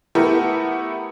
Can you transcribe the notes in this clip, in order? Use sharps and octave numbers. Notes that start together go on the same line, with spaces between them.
A3 B3 E4 G4 A#4